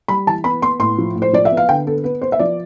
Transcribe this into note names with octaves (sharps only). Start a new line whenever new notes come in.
G3 B5
E3 A5
B3 B5
B3 C6
A2 C6
F3
A2
C5
F3 D5
E5
B3
F5
D3 G5
B3 A4
B3 B4
B3 C5
E5
F3 D5